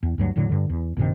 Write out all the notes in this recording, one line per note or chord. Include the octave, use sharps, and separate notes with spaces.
E2
D2 G2 F#3
E1 A2 D3 F#3
G2 D3
E2
A#1 G2 C3 D#3